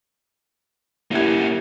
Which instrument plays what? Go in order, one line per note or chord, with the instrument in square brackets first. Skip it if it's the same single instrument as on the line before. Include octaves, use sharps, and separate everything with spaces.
[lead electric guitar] A#3 C#4 [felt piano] E4 G4 G#6